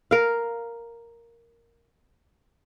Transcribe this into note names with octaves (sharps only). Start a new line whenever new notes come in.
A#4 F5